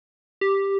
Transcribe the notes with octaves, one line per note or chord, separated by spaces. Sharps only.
G4